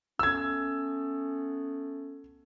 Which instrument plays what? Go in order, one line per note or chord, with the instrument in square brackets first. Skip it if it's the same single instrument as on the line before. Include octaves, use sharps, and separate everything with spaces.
[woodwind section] A3 B3 C#4 [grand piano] E6 G#6